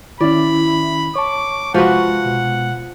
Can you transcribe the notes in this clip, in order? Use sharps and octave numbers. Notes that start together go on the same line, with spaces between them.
D#3 C#4 E4 D5 B5
C#5 A5 C#6 D6
C3 F3 G#3 F#4 B4 F#5
B2